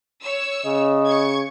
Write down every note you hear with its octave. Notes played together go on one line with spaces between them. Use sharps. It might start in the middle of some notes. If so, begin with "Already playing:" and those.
C#5 E6
C#3 D#5
C#6 G#6